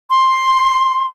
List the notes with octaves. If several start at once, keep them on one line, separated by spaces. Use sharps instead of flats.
C6